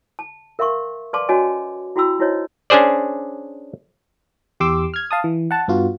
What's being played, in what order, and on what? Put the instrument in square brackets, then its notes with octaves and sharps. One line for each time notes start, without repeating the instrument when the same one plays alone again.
[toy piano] A5
A#4 E5 F5 C6 C#6
B4 D5 F5 A5 C6 D6
C#4 F#4 C#5 D#5 G#5 A5
E4 F#4 G5 B5 E6
D#4 E4 F#4 C5 C#5 D#5
[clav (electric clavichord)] C#4 D4 G#4 C5 D5
[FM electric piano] E2 G4 C6 D6 E6
F6 G#6
F5 A5 D#6
E3
F#5 A5
G2 B3 F4 F#4